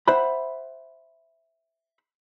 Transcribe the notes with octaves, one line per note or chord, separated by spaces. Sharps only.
C5 E5 F#5 B5